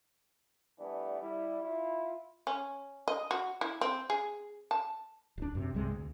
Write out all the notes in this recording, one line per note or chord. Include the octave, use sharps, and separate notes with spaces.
E3 G3 A3 B3 D4
G3 E4
E4 F4
C#4
D#5
F#4
E4
C4
G#4
A5
D1 D4
F#2 C3
C2 G2 C3 G#3
D2